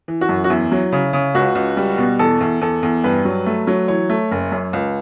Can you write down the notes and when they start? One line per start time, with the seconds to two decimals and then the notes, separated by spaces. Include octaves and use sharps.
0.08 E3
0.21 F#4
0.29 F#2
0.44 F#4
0.50 E2 E4
0.72 F#3
0.93 C#3
1.13 C#3
1.35 C#2 F#4
1.55 C#2
1.77 G3
1.98 B2
2.19 E2 A4
2.41 E2
2.61 E2 A4
2.83 E2
3.04 G2 B4
3.25 F#3
3.46 A3
3.67 F#3
3.88 E3 C#5
4.10 A3
4.31 F#1
4.52 F#2
4.73 C#2